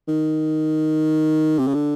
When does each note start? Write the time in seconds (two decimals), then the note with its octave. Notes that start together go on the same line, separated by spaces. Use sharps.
0.08 D#3
1.59 C3
1.67 C#3
1.75 D3